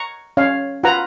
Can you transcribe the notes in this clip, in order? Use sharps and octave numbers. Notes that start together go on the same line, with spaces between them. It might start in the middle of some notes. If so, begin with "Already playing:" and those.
Already playing: A#5 C#6
C#4 C#5 F5
F4 B4 F#5 A#5